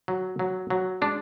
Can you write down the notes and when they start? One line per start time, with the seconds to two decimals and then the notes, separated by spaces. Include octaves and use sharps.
0.08 F#3
0.39 F#3
0.70 F#3
1.02 G#3 D4